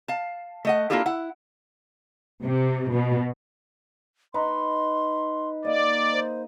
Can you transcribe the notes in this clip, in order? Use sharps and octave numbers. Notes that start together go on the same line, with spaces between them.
F5 A5
A3 D#5 F#5
A#3 D4 E4 F4 G4 A4
E4 F#5
C3
B2
D#4 B4 A#5 C6
A#3 D5 D#5
C5